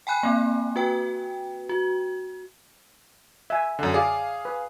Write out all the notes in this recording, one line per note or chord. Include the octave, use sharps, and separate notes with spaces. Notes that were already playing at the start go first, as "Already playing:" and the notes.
G5 G#5 B5 F#6
A#3 C4
F#4 B4 G5
F#4
E5 G#5
F#2 D3
G#4 D5 F5
B4